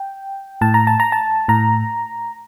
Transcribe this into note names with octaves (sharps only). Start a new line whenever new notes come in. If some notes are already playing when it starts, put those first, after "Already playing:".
Already playing: G5
A2 A5
A#5
A5
A#5
A5
A2 A#5